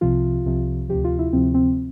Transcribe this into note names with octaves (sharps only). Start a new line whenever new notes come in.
C2 C3 F3 F4
C2 C3 F3
D2 C3 F3 G4
F4
E4
D2 C3 F3 C4
C4